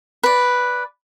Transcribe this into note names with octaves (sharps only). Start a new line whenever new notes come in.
B4 D5